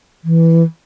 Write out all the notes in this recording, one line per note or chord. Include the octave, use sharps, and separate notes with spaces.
E3